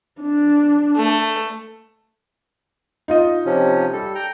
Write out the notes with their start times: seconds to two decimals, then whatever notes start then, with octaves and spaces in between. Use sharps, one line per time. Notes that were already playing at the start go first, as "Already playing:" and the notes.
0.21 D4
0.96 A3
3.08 D#4 F4 D#5
3.46 C3 F3 C#4
3.93 G3 A4
4.15 G5 A#5